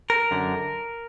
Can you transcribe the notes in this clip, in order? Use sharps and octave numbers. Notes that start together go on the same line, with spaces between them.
A#4
F#2 D3